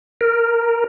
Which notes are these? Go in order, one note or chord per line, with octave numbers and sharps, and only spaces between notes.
A#4